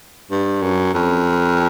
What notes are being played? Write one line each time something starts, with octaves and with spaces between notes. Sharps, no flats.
G2
F#2
F2